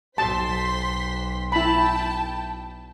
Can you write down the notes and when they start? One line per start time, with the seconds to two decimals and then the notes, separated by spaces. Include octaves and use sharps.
0.18 B1 C5 A5 C6 B6
1.52 E4 G5 A5 B5